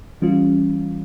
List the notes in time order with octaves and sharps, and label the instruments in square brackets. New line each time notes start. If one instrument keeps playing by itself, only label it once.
[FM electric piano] E3 G3 C#4 F4